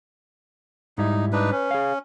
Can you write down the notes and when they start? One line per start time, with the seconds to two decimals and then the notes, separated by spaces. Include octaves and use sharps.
0.98 G#2 G3 D#4 E4
1.33 D4 D#4 B4
1.52 C#4 B4
1.71 G#4 F5